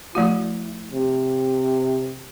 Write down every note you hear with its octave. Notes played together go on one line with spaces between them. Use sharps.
F3 A3 E4 F#4
C3